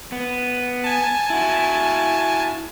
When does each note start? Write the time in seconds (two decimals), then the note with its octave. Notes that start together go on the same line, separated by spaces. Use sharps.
0.12 B3
0.84 G#5 A5
1.30 E4 F#4